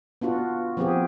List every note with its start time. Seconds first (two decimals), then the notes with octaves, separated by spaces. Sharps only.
0.21 B3 D4 F4 F#4
0.77 F3 B3 C4 F4 G4 G#4